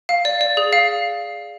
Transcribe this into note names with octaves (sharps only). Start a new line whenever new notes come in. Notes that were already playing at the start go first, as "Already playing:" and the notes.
F5
D5
D5
G#4
F5